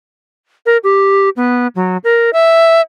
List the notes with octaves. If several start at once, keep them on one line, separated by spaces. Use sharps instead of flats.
A#4
G4
B3
F#3
A#4
E5